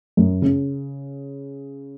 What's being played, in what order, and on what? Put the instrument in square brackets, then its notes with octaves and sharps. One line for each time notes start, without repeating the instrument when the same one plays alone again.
[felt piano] F#2
C#3